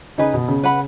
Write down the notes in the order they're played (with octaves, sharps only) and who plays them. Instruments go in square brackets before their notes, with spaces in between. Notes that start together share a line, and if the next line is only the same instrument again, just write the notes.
[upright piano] C#3 [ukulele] D#4 G#4 B4
[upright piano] B2
C#3
[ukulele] B4 F#5 B5